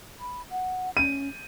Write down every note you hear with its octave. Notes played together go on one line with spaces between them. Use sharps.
B5
F#5
C#4 D#7